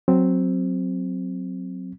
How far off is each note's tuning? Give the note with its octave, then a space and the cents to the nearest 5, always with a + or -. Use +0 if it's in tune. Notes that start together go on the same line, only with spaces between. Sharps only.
F#3 -5 C4 +0